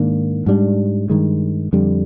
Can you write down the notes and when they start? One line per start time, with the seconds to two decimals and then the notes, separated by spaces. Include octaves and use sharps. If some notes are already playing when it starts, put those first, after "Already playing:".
Already playing: G#2 D#3 A#3 D4
0.46 G#2 G3 D4
1.10 G2 D#3 G#3
1.73 F2 D3 G3